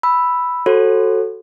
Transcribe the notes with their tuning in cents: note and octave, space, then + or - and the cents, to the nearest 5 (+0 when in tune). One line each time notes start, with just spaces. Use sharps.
B5 +0 E6 +0
F#4 +0 A4 +0 C#5 -45